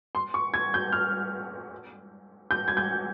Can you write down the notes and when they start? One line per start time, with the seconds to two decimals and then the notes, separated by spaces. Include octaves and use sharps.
0.15 C6
0.34 C#6
0.54 G#6
0.74 G6
0.92 F6
2.51 G6
2.68 G#6
2.77 G6